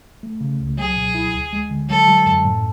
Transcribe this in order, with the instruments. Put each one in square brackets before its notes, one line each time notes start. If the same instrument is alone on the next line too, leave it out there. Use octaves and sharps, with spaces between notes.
[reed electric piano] A3
C#3
C#2
[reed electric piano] F#3 [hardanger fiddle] G#4
[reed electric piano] B2
E4
D2
G#3
D3
[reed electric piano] F#3 [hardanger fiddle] A4
[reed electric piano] F#3
F#2
A2